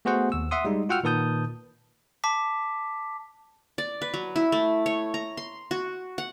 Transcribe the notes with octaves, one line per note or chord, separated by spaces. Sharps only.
A3 B3 F#4 G#4 C5 F#5
D#2 E6
E5 F#5 C6 D#6
G3 G#3 D#4
F4 F#4 F#5 G5 E6 F6
A#2 D#3 B4 A5 D#6 G6
A5 D6 B6
D5
B4
F#3
E4
A3
C#5
A#5
C6
F#4
F#5